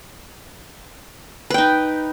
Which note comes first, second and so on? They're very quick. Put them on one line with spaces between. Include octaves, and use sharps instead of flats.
B4 G5 D#4